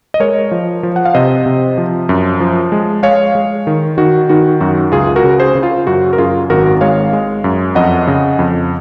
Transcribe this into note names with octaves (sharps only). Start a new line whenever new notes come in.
D#5
G#3 A#4 C#5
F3
F3
F#5
F5
C3 C5 D#5
C3
F3
F#2
F3
G#3
G#3 C#5 F5
G#3
D#3
D#3 F#4
D#3 F#4
F#2 F#4
C#2 F4 G#4
F#4 A#4
C#3
G#4 C5
C#3
F4
F#2 F#4
A#4
F#2 F4 G#4
G#1 F#4 A#4
G#3 C#5 F5
G#3
F#2
F2 D#5 F#5
C#3
F2